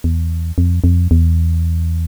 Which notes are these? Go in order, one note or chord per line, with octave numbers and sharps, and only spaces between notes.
E2
F2
F2
E2